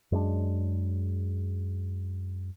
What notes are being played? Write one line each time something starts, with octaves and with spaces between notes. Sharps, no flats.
F#2 G#3 B3 D4